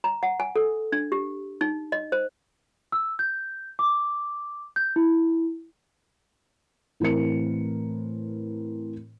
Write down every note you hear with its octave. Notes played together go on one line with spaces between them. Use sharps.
A#5
F#5
G#5
A4
D4
G4
D#4
D#5
C5
E6
G6
D6
G6
E4
A2 E3 C4 A#4 C#7